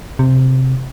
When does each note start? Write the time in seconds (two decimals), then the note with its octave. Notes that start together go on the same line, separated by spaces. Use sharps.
0.19 C3